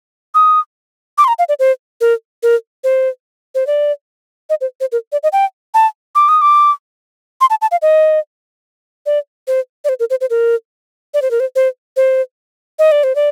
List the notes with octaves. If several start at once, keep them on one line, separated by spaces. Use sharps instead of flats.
D#6
D6
C6
A#5
F5
D5
C5
A#4
A#4
C5
C5
D5
D#5
C5
C5
A#4
D5
D#5
G5
A5
D6
D#6
D6
C6
A5
A5
F5
D#5
D5
C5
D5
C5
A#4
C5
C5
A#4
D5
C5
A#4
C5
C5
C5
D#5
D5
C5
D5